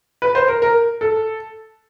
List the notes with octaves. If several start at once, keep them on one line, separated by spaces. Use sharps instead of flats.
B4
C5
A#4
A#4
A4